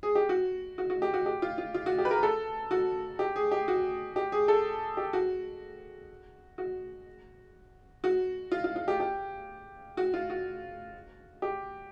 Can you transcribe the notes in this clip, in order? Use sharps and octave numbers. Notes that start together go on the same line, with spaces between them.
G#4
G4
F#4
F#4
F#4
G4
F#4
G4
F4
F4
F4
F#4
G4
B4
A#4
A4
F#4
G4
G#4
G4
F#4
G4
G#4
A4
G4
F#4
F#4
F#4
F4
F4
F4
G4
G4
F#4
F4
F#4
G4